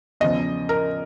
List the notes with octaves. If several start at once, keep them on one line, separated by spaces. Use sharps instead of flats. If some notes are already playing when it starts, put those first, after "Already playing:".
E2 C#3 F3 D#5
A#4